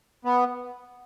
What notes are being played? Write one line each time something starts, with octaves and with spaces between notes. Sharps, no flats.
B3